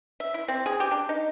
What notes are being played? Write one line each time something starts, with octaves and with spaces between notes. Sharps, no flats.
E5
E4
C4
G#4
G4
D4
D#4